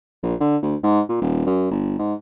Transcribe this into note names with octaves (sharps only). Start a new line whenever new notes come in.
A#1
D3
D2
G#2
A#2
D#1
F#2
G1
G#2